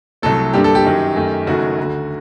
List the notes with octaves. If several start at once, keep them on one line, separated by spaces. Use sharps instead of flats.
C2 C3 F#3 A3 A4
G2 D3 G3 A#3 G4
A4
G4
F#2 D#3 F#3
F#2 D#3 A3
F#1 F#2 D#3 F#3 A3 F#4
D2 D3 A3